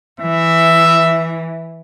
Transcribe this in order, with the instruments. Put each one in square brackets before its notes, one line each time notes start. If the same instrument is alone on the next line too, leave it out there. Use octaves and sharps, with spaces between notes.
[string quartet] E3 [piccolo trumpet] E5